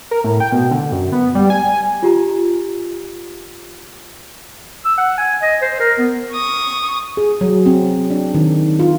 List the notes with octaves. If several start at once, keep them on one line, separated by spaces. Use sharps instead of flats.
A#4
A2
G5
B2
D3
F#2
B3
G3
G#5
F4 G4 A#5
E6
F#5
G#5
D#5
C5
A#4
B3
C#6 D#6
G#4
F#3
C4
D4
D#3
F4